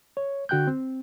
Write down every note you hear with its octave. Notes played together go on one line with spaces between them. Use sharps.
C#5
D3 F#4 G5 F#6 G6
C4